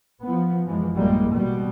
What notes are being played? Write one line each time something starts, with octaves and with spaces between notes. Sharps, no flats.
F3 B3
F#2 E3 F3 G#3
A1 F#2 G3 G#3 A#3
B2 G3